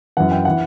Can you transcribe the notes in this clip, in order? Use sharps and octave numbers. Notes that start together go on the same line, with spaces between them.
F#2 E3 F#5
G5
E3 F#5